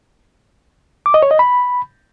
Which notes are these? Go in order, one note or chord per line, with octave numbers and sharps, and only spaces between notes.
D6
D#5
C#5
D#5
B5